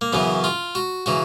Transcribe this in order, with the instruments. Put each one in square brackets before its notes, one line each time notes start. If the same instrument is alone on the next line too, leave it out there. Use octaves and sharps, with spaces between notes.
[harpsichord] A#3
F#2 C#3 E3 B3
F4
F#4
C#3 E3 F#4